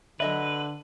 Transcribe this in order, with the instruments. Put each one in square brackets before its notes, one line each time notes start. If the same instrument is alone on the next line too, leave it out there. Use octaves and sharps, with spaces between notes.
[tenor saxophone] D3 [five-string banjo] F#3 D#5 E5 [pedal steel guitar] B4